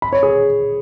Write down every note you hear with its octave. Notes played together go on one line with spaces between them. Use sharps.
B5
C#5
G#4